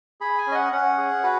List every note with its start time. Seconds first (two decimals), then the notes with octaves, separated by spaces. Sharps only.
0.21 G#4 B5
0.38 G#5
0.46 C#4
0.52 D#5
0.55 F#5
0.72 C#4 F#5
0.98 G#4
1.23 F#4 B4